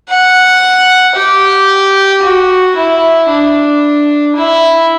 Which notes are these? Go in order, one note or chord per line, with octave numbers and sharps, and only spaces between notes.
F#5
G4
F#4
E4
D4
E4